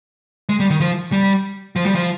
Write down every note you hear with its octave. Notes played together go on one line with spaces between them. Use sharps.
G#3
G3
D#3
F3
G3
F3
G3
F3